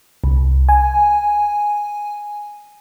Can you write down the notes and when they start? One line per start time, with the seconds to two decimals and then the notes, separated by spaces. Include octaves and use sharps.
0.24 C2
0.69 G#5